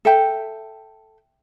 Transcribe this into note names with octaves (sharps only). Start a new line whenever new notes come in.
A4 E5 G5